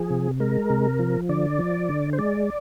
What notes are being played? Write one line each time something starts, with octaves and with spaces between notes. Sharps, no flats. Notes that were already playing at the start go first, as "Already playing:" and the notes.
Already playing: F3 G#4
C3
G#3 A#4
C3
F3
D3 D5
F3
D3
C5
G#3 D5